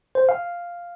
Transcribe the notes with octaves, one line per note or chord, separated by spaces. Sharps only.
C5
F5